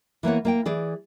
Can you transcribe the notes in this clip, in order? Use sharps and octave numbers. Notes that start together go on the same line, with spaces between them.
E3 A#3 B3 C#5
A#3 D5 G5
E3 G#4 D5